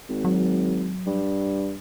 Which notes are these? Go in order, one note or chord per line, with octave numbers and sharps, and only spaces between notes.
G#1
F#3
G2